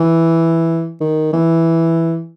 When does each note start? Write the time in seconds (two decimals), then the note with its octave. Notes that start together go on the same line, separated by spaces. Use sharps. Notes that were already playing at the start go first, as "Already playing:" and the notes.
Already playing: E3
1.01 D#3
1.33 E3